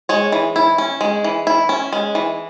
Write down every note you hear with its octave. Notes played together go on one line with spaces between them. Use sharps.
G#3 C#5
E3
E4
C#4
G#3
E3
E4
C#4
G#3
E3